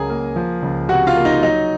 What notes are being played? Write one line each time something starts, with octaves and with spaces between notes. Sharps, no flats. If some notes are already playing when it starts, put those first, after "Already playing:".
Already playing: C#2 C#3 F#3 G#4 A#4 G#5 A#5
A#3
F3
C#2
C3 F#4 F#5
F4 F5
A#3
D#4 D#5
F#3 D#4 D#5